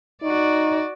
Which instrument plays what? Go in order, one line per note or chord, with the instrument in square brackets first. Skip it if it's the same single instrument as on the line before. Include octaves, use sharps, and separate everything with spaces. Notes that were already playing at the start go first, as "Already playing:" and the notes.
[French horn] D#4 [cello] F#4 D5